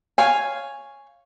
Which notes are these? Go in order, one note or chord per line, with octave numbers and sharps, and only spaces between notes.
C#5 F5 G#5